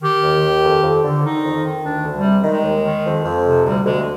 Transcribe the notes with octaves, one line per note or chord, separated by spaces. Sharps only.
D#3 G4
D#2
D#3
F2
F2
D3
D#3 D#4
F2
D#3
D2 D4
D2
G3
C3
D#3 G#3
D#2
D#3
F2
F2
C3
D2 G3
D2 G#3